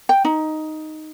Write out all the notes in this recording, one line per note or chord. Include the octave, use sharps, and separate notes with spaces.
G5
D#4